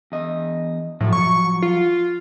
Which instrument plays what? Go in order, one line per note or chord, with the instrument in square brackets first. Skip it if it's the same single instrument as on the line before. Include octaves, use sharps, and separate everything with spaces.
[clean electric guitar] E2 D#5
[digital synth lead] A2 [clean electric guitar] F3 F#3
[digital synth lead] C#6
F4